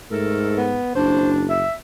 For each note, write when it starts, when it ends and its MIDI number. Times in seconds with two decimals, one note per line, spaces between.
0.11 0.81 44
0.11 0.68 57
0.11 0.68 69
0.11 0.68 70
0.57 0.95 59
0.96 1.67 30
0.96 1.47 62
0.96 1.32 72
1.50 1.73 76